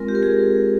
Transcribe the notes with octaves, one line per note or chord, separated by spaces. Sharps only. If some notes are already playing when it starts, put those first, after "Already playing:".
Already playing: G#3 C4 F4 A#4
G4
A#4
G#4